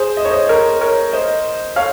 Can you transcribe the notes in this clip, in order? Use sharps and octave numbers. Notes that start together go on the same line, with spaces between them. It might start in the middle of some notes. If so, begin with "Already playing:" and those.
Already playing: G#4 C5
D#5
C#5
C5 D#5
A#4 C#5
A#4 C#5
C5 D#5
C#5 F5